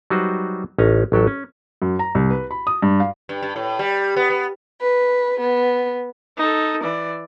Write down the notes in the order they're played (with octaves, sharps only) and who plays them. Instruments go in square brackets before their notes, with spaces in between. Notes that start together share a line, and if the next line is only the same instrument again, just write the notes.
[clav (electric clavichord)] F#3 G3 D#4 F#4 B4 C5
A1 C#4 D#4 A#5
A1 F#3 G4 A4
C#4
[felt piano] F#2
A#5
C2
B4
B5
D#6
G2
F5
[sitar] G2
G2
A2
G3
B3
B3
[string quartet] B4
B3
[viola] D#4 A4
E3 D5